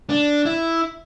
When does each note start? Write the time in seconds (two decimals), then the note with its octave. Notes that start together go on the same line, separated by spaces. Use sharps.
0.09 D4
0.46 E4